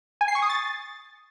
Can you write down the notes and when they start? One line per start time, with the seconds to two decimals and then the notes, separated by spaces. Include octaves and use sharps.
0.21 G#5
0.28 C7
0.35 C#6
0.42 D#6
0.49 A6